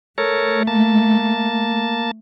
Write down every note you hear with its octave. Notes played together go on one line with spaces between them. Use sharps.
A3 A4 A#4 C#5
A#3 A5